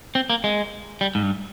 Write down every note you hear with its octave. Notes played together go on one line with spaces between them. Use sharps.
C4
A#3
G#3
G3
G#2
G2